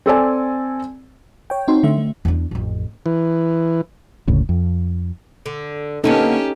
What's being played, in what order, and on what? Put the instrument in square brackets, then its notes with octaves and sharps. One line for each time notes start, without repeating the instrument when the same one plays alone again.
[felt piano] C4 A4 D5 G#5
[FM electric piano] C#5 G5
C4 D#4 F#4 C6
D3 A3 E5
A3
[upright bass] E2 D4
A1 F2
[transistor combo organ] E3
[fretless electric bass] F#1 D2 A2 C#3
F2
[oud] D3
[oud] D3 A#3 B3 [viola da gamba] C#4 G4 [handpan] D#4 A4